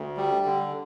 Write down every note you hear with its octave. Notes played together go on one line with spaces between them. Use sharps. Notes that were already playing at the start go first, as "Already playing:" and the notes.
Already playing: D2
G3
D3